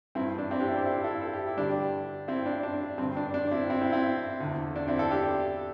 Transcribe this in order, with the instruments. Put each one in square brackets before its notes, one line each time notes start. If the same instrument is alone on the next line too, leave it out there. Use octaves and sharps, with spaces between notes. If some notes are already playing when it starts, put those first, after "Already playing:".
[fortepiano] G2 E3 C4 E4
D4
C4 E4
D4 G4
E4 A4
G4 C5
E4 A4
E4 A4
A4
G4
E4
G2 D3 D4 G4
C4 E4
D4
D4
G2 D3 C4
D4
D4
C4 E4
C4 E4
C4 E4
C4 E4
E2 D3
D4
C4 E4
E4 A4
D4 G4